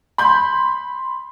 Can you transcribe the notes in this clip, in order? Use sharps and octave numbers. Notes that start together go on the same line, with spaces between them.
B5 C6 G6